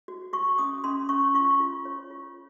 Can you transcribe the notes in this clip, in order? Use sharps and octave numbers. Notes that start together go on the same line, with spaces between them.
F#4
F#4 C#6
C#4 D#6
C#4 C6
C#4 C#6
F4 C#6
F4
C#5
F4